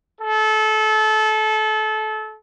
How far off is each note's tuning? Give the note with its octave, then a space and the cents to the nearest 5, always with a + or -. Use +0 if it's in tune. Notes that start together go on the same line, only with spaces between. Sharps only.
A4 -25